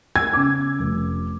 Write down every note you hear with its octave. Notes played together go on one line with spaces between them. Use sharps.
E6 G#6
C#3 D6
F1